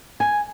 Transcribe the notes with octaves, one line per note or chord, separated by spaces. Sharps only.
G#5